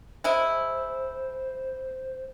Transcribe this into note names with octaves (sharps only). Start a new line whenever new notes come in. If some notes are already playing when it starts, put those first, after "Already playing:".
G#3 E4 C5